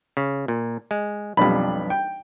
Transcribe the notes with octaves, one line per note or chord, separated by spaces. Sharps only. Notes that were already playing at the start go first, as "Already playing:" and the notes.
C#3
A#2
G#3
B1 F2 G3 D4 B5
G5